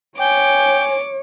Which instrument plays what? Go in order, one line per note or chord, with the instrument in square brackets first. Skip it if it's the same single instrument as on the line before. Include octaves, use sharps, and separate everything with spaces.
[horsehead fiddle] C#5 [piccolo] G5 [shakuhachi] G#5 [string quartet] D6